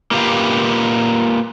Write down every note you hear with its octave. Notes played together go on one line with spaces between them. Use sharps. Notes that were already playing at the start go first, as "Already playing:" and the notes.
A#3 F4 G4 B4 F5